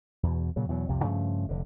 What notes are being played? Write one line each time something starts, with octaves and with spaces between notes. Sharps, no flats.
E2 B2
A#2 C#3 F#3
E2 B2 F#3
C2 F2 C3
G2 C#3 F3 A3
F1 D3